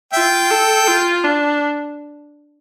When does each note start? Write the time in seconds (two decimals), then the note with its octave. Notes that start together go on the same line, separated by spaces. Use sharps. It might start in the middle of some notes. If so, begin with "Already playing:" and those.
0.13 F4 E5 G5
0.51 A4
0.87 F4
1.24 D4